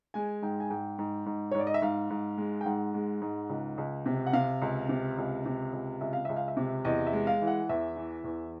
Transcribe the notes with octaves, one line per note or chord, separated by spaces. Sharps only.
G#3 G#5
G#2 G5
G#5
G#2 G5
G#2
G#2
C#5
G#2
D5
D#5
E5
G#2 F5
G#2
G#3
G5
G#2 F#5
G#3
G#2
C#2
C#2
C3
F#5
C3 F5
C#2
C3
C#2
C3
C#2
C#2 E5
F5
C#2 E5
F5
E5
C3
E2 D#5
E5
G#3
F5
E3
F#5
E2 E5
E3
E2